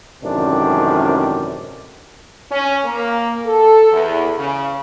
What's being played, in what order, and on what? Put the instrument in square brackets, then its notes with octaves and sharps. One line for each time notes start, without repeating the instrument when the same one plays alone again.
[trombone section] A1 F#2 C3 D#3 G#3 D4
[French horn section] C#4
A#3
A4
E2
C#3